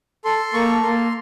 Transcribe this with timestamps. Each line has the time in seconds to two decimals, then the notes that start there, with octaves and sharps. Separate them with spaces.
0.25 A4 C6
0.54 A#3 C#6
0.83 A#3 C6